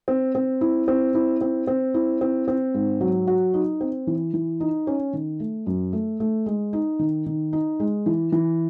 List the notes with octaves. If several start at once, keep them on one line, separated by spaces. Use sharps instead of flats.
C4
C4
E4
C4
E4
C4
C4
E4
C4
C4
G#2
F#3
F#4
D#4
C4
E3
E3
D#4
C#4
D#3
A3
F#2
A3
A3
G#3
D#4
D#3
D#3
D#4
G#3
E3
E3